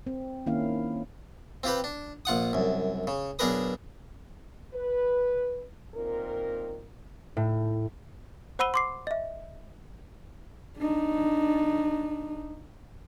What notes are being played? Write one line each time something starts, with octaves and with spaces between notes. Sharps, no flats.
C4
D#3 A#3 C#4 E4 F5
C4 F4 G4 B4
D4
A#1 F4 F#5 D#6
C2 F#2
C#3
B1 D4 G#4 A#4 B4 D#6
B4
A#2 D#3 C4 A#4
A2
C5 F#5 B5 E6 D#7 G7
C6 D6 C7
D#5 E5
D4 D#4